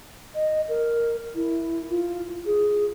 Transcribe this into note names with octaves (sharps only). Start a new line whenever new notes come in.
D#5
A#4
E4
F4
G#4